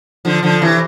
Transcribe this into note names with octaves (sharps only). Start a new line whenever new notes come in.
D3 F3
D3 F3
C3 E3